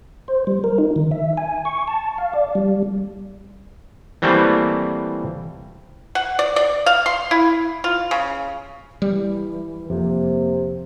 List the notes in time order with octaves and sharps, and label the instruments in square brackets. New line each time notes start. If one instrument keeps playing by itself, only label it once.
[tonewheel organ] C5
G3
A#4
D#4
D#3
E5
G#5
C#6
A5
F5
D5
G3
[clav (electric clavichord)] E3 G3 A3 A#3 C4
[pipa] F#5
D5
D5
F5
C6
E4
F4
C#3
[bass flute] E3 [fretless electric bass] G3
[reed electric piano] F2 [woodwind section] C3 [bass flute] A#3